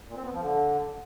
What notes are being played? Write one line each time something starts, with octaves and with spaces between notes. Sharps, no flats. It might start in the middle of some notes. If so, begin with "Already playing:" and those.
A#2
C4
B3
F3
D3